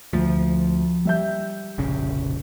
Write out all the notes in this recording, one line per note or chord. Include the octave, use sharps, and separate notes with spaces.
D2 F3
G3 E5 G6
F1 A#1 C#3